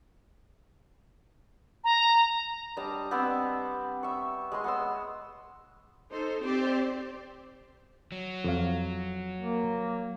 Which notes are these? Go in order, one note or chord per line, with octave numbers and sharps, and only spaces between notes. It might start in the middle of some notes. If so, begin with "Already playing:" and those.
A#5
G3 D4 D#5 A5
B3 C4 D5 E6
E5 C#6
G#3 D#5 C6
B3 C6 E6
D#4 A4 C5
C4 G4 C5 D5
F#3
F2 F5
A#3